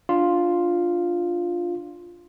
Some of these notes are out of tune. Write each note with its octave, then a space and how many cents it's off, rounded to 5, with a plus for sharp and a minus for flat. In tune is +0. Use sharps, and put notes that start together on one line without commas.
D4 +0 F4 +0